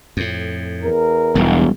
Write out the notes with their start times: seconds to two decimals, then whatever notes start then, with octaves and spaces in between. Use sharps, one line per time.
0.17 F2 A2
0.83 E2 A#4
1.35 E1 B1 G3 G#3